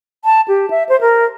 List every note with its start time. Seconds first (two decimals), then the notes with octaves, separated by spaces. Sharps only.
0.25 A5
0.48 G4
0.70 E5
0.89 C5
1.01 A#4